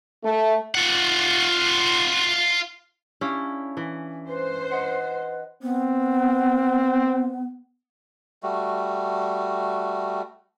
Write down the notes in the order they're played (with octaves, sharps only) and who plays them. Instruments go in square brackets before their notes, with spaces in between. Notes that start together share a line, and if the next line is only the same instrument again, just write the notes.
[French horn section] A3
[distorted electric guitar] F4 F#5
[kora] C#4 E4 [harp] D4 G4 F5
[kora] E3
[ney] B4 [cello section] C5
[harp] D#5 F#5
[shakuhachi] B3 [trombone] C4
[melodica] G3 A3 F#4